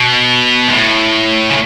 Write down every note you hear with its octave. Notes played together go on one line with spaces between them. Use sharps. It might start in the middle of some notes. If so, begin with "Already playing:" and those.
Already playing: B2
G#2
A2
C#3